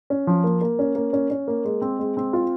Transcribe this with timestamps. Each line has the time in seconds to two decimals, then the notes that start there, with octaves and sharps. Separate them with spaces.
0.10 C#4
0.27 F3
0.44 A#3
0.61 A#3
0.79 C#4
0.96 A#3
1.13 C#4
1.31 C#4
1.48 A#3
1.65 G#3
1.82 C4
1.99 G#3
2.17 C4
2.33 F4